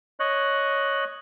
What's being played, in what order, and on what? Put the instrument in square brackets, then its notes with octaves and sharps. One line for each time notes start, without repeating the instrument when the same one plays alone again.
[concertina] C#5 D#5 F#6